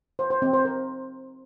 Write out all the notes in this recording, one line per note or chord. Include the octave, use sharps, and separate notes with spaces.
C5
C5
C4
C5
A#4